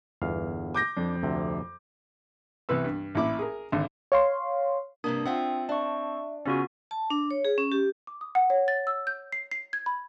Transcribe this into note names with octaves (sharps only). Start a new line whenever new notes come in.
G1 E2 F5
D6 G6 A#6
F2 D4
D2 C3
C2 E3 B3 B4 E6
G2
A1 A#2 E4 D6
G#4 A#4
G#1 D3
C#5 F5 C6
G2 C3 A#3 D4 D#6
C4 F4 E5 F#5 G5
D4 E5 A5 C#6
C#3 B3 C#4 F4 F#4
A5
D4
C#5
G#4
C#4
G4
D6
D#6
F#5
C#5
A6
E6
G6
C7
C7
G#6
B5